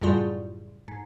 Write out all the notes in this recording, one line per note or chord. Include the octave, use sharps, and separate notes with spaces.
F#2 A2 C#3 G3 F4
G#2